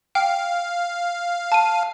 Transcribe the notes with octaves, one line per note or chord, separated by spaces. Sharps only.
F5 G5
A5 D#7